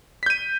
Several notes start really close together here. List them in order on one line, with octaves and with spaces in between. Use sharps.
B6 G6 D#7